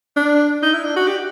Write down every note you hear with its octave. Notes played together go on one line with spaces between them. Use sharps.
D4
D#4
E4
D4
F#4
G4